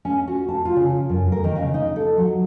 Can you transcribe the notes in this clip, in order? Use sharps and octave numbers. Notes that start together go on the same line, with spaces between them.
C#4
F#4
A5
F4
C#3
F#2
A#4
D#3
C#3
D#4
A4
F#3